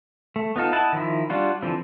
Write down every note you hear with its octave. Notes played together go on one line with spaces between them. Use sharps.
A3
B3 D#4 F4 A4
E4 D#5 F#5 A5
D#3 F3 E4
G3 D4 F4 F#4
D3 E3 F3 C4